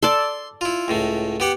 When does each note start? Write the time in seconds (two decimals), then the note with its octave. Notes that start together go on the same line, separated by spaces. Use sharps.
0.03 A4 D5 C6
0.61 E4 F4
0.88 C#2 A2 A3
1.40 B3 G4 F#5